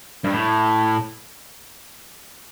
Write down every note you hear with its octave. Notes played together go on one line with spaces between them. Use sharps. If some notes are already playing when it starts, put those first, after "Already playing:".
G2
A2